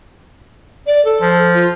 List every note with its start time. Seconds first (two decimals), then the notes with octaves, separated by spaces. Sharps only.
0.86 D5
1.05 A4
1.21 F3
1.54 F4